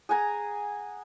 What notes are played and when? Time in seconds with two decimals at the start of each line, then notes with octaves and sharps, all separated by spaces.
0.09 G#4 F#5 G#5 A#5